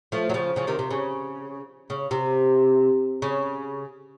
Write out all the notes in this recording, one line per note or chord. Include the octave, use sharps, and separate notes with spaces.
F3 A3
F#3
C#3 F3
C#3 F3
C3 D#3
C3
C#3
C#3
C3
C#3